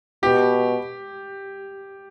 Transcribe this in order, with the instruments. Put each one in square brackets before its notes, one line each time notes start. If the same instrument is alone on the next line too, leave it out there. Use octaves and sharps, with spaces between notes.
[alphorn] B2 [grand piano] G4